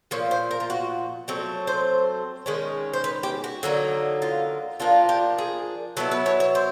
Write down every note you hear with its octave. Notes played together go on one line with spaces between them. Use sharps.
A#2 F3 C#5
C5
A#4
F4
F#4
F#3 A3 C4
C5
D#3 G#3 C#4
C5
B4
G4
F#4
D3 F#3 A#3 D#4
F4
F3 A#3 D4 F4
G4
G#4
F#3 B3 E4 A4
B4
C#5
C#5
C5